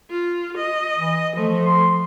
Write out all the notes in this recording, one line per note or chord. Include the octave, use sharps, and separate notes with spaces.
F4
D#5
E3
F3 A3
C6